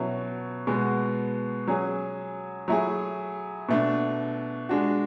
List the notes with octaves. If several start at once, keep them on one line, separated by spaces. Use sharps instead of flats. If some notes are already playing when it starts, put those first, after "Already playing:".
Already playing: B2 F#3 C#4 E4
B2 G#3 B3 F#4
F#3 C#4 G#4
F#3 A3 E4 G#4
B2 A3 D4
G#3 D4 F#4